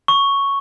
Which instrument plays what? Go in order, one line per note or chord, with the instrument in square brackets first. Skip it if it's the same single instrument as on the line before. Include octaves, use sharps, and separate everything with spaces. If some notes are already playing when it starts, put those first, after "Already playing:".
[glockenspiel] C#6